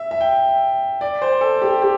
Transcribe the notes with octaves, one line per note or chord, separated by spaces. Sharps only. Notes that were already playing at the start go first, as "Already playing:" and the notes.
Already playing: E5
E5
G5
D5
C5
A4
G4
G4